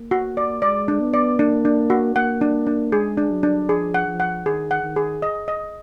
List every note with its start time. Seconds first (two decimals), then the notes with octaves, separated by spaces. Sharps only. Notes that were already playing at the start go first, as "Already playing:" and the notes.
Already playing: A#3
0.11 F#4
0.37 D5
0.62 G#3 D5
0.88 D4
1.01 B3
1.14 D5
1.39 A#3 D4
1.65 D4
1.90 F#4
2.16 A#3 F#5
2.41 D4
2.67 D4
2.92 G#3 G#4
3.18 D4
3.31 F#3
3.43 D4
3.69 F3 G#4
3.94 F#5
4.08 F3
4.20 F#5
4.46 D#3 G#4
4.71 F#5
4.83 D#3
4.96 G#4
5.22 D#5
5.48 D#5